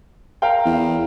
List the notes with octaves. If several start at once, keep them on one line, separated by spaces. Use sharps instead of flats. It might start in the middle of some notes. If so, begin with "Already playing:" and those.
A#4 F5 G5
E2